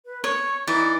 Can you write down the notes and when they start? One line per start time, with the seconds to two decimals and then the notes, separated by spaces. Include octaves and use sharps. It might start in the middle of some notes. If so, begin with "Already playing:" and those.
0.06 B4
0.24 C#5 C#6
0.67 E3 D#4 D5